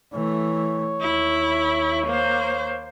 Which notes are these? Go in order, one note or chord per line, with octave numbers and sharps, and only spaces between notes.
E3 A3 C#5
D#2 E4
A#3 C5